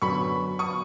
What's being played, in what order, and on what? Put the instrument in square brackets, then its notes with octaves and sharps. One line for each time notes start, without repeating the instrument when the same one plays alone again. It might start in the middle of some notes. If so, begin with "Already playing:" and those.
[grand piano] F#2 D3 F#3 B3 [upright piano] B5 C#6
[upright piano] C#6 D#6